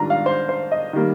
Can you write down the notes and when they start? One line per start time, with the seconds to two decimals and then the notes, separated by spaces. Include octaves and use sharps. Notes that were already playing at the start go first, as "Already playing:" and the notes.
Already playing: G#2 D#3 G3 D4 F4 A#5
0.10 F5
0.26 C5
0.49 C5
0.71 D#5
0.93 D#3 G3 A#3